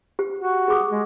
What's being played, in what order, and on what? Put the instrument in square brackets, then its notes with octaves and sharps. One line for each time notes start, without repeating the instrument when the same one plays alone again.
[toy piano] G4
[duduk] F#4
[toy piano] G#4 D6 D#6
[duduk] G#3